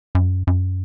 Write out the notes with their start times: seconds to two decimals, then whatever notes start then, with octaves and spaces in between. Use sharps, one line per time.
0.15 F#2
0.47 F#2